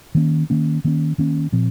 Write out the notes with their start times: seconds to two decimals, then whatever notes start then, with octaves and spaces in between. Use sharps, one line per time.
0.15 D#3 A#3 C#4
0.50 D#3 A#3 C#4
0.84 D#3 A#3 C#4
1.18 D#3 A#3 C#4
1.52 A#2 F3 C4